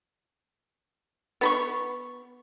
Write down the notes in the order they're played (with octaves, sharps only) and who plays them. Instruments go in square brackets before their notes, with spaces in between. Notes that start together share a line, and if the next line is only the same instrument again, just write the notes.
[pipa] B3 B5 C#6